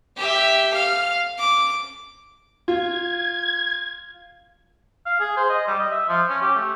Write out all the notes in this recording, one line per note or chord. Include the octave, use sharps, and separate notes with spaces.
G4 E5
F5 F6
D6
F4 G#6
F5
G#4
C5
D#5
G3
D#5
E5
F3
C#4
G4
A3